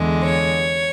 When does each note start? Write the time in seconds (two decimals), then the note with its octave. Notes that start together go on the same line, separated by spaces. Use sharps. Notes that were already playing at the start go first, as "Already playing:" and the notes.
Already playing: E2 D3 G#3
0.24 C#5